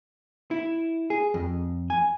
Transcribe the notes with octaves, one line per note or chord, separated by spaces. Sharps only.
E4
G#4
F2
G#5